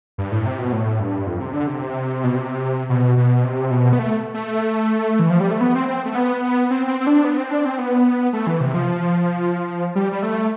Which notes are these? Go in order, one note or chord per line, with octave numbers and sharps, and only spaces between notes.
G2
A2
C3
B2
A2
G2
F2
C3
D3
C3
B2
C3
B2
B2
C3
B2
B3
A3
A3
E3
F3
G3
A3
B3
C4
C4
A3
B3
C4
C4
C4
D4
B3
C4
D4
C4
B3
A3
E3
C3
F3
G3
G3
A3